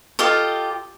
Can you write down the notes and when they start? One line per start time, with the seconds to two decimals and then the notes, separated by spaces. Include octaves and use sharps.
0.19 F4 G4 A4 D#5